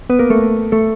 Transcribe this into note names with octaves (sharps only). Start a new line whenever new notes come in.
B3 B4
A#3 A#4
A3 A4
A3 A4